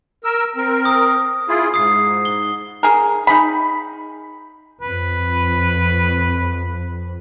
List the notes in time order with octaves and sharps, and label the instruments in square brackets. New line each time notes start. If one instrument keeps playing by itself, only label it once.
[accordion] A#4 E6
C4 A#4
[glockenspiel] D#6
[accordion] E4 F4 G#4
[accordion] G#2 [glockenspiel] D#6 C7
[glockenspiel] G7
[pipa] G#4 A#4
D#4 G#4 B5
[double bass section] F2 [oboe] B4